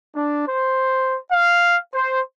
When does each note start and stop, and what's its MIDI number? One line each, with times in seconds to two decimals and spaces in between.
0.15 0.47 62
0.47 1.17 72
1.31 1.77 77
1.94 2.20 72